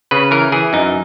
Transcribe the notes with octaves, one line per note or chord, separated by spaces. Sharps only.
C#3 B4
E3 A#4
E3 G#4
F#2 D#4